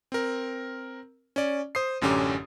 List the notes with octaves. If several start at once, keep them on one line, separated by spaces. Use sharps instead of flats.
C4 A#4
C#4 D5
C5 D#6 C7
A1 F#2 D3 C#4 G4 D6